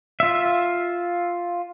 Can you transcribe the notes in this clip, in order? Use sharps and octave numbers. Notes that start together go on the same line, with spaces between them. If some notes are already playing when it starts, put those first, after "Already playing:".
F4 E5